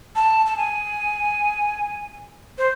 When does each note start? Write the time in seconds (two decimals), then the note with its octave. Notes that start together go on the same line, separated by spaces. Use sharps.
0.16 A5
0.46 A5
0.57 G#5
2.58 C5